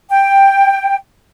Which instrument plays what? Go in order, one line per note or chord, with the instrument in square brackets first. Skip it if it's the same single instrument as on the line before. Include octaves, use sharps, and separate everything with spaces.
[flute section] G5